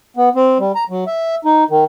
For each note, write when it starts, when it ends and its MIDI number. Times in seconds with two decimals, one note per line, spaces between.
0.17 0.29 59
0.35 0.58 60
0.59 0.72 55
0.75 0.84 82
0.90 1.04 54
1.07 1.35 76
1.45 1.64 63
1.70 1.84 51